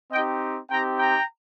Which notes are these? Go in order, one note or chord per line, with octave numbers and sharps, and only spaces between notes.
C4 D#4 G4 D#5 G5
C4 D#4 G4 G5 A#5
G5 A#5